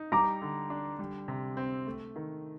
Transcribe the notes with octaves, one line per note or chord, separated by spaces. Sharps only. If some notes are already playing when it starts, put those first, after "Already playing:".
Already playing: D#4
G3 A#5 D6
D3
D4
G3
C3
C4
A3
D#3